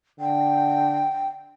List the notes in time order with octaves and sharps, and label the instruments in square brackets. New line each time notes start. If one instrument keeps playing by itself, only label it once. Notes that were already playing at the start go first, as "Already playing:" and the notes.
[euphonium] D3 [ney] G5